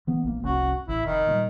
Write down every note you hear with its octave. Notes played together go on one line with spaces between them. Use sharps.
E3 B3
A#1 A#3
F1 C2 C#4 F#4
A1 E4
F1 D#3
A#2 F#3 G3